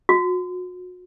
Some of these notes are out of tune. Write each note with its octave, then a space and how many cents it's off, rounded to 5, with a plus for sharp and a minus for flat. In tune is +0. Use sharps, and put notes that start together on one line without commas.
F#4 -35